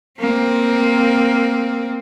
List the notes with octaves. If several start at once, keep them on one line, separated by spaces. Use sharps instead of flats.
A#3 C4